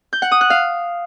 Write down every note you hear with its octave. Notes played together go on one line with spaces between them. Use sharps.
G6
F#5
D#6
F#6
F5